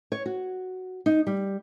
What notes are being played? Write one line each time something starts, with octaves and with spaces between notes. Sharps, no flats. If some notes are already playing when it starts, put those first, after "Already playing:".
C#5
F#4
D#4
G3